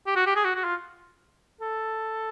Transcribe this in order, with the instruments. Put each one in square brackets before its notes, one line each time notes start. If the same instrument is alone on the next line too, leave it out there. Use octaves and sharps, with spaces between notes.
[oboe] G4
F#4
G4
G#4
F#4
F#4
F4
A4